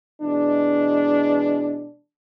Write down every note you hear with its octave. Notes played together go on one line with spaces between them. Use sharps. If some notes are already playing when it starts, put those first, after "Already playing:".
B2 E3 G#3 D4